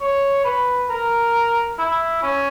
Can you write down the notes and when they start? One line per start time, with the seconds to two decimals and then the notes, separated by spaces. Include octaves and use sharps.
0.01 C#5
0.44 B4
0.90 A#4
1.78 E4
2.23 C#4